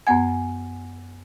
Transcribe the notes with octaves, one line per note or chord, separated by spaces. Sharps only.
F#2 B3 F#5 G#5 G#6